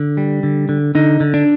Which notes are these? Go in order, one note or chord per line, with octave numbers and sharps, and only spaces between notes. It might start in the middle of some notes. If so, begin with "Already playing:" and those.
Already playing: D3
G3
D3
D3
D3 D#4
D3
D4